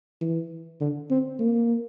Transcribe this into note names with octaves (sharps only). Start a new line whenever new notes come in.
E3
D3
C4
A#3